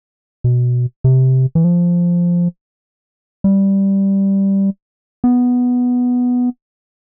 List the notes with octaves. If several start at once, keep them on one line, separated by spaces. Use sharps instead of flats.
B2
C3
E3
F3
G3
B3